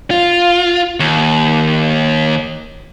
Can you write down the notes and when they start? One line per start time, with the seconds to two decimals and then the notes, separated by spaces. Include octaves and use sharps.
0.11 F4
1.00 D#2